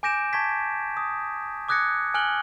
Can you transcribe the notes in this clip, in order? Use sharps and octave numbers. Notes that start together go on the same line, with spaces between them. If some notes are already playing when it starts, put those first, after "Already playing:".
G#5 D6 G6 A#6 D7 E7
A5 C#6 G#6 B6
D#6
D6 D#6 F#6 G#6 A#6 C#7
G#5 F6 F#6 C#7 F#7 G7